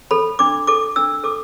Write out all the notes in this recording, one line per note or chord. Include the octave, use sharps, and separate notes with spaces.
A4 B5
D4 D6
A4 D6
D4 E6
A4 D6